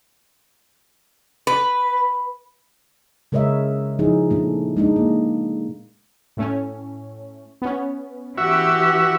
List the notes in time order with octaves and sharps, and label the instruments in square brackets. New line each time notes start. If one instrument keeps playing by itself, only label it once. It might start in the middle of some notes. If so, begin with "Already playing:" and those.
[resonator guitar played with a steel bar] B4
[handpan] C#3 G#3 A#4 C#5 D#5 E5
F3 D#4 E4 G#4
A#2 A3 D4
G#3 D4 D#4
A#3
[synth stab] A2 A3 C#4
B3 C#4
[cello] E3 G4 [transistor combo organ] F#4 E5